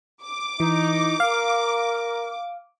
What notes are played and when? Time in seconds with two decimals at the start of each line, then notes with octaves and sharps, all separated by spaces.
0.23 D6
0.60 E3 D#4
1.20 A#4 F5